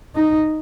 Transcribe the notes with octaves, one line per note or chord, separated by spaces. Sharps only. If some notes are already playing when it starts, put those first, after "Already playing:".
D#4